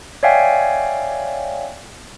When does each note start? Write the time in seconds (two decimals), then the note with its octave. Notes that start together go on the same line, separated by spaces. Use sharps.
0.23 C#5 D5 E5 F5 G5 G#5